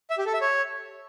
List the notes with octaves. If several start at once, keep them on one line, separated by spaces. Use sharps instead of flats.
E5
G4
A4
E5
C#5